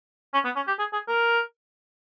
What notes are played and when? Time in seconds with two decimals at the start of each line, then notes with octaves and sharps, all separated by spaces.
0.34 C#4
0.45 B3
0.56 C#4
0.67 G4
0.79 G#4
0.93 G#4
1.08 A#4